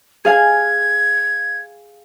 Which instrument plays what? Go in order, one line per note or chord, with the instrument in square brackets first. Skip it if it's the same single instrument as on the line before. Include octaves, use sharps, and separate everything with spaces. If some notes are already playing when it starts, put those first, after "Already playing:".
[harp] G#4 F5 G#5 [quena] G#6